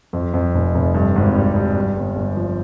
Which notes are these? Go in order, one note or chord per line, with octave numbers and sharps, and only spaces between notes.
F2
F2
F1
F1
G2
G#1
G3
G3
G2
G1
G1
F3